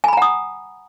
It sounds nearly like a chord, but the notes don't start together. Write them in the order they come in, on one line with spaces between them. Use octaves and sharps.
G#5 B5 A#5 F#5 D#6